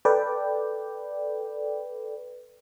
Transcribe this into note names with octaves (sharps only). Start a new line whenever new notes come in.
A4 B4 D5 G5